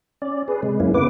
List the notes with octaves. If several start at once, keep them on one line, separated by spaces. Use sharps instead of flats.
C#4 D5
G#4 B4
C3 G#3
F#2 A#3 C#4 E4
C#3 A#3 B3 B4 D6